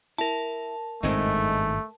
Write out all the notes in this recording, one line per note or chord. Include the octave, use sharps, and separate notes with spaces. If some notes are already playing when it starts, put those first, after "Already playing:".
E4 A#4 A5
G#1 G2 A#2 G#3 A3 C4 D#4